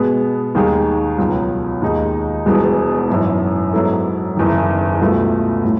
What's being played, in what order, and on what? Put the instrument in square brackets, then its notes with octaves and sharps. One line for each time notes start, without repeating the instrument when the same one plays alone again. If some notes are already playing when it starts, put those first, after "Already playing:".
Already playing: [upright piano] B2 G#3 B3
D#2 D#3 G#3
C#2 B2 F#3 C#4
D#2 D#3 G#3 D#4
E1 E2 B2 G#3
G#1 F#2 E3
G#2 F#3 B3 E4 A4
F#1 E2 D#3
C#2 B2 A3 E4
A2